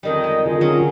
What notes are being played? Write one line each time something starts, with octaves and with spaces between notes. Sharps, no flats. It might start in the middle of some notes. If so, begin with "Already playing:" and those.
F2 D#3 G3 D#5
G#3
D3 F4 G#4
F#3 C#4